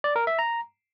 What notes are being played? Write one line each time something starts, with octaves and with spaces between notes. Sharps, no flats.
D5
A#4
E5
A#5